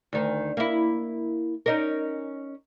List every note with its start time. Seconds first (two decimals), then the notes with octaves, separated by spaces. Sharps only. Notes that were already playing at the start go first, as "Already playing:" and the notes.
0.13 D2 D#3
0.57 A#3 E4
1.66 C#4 D#4 A#4